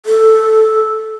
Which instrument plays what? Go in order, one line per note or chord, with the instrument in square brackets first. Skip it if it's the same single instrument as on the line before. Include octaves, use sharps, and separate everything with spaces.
[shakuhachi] A4